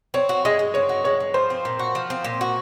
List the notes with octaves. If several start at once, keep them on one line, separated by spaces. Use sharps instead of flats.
C4 C#5
F#4
G#3 D#5
G#3
C4 C#5
F#4
G#3 C#5
G#3
F3 C5
C4
A#2
F#4
F3
C4
A#2
F#4